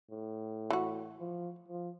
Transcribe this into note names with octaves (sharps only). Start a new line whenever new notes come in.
A2
E3 F#4
F3
F3